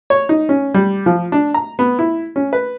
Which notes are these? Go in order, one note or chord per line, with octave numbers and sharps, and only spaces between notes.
C#5
D#4
C#4
G3
F3
D4
A#5
B3
E4
C#4
B4